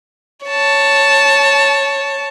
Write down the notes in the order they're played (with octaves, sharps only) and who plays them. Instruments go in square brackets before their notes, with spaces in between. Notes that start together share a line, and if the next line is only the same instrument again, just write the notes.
[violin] C#5 A5